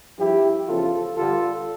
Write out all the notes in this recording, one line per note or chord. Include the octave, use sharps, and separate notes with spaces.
G2 F3 E4 G4
E2 C#3 F3 F4 A4
G2 D3 G3 F4 A4